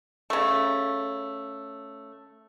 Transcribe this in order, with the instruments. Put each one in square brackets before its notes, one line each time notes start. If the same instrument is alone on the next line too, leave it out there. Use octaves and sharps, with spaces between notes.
[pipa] C#3 A3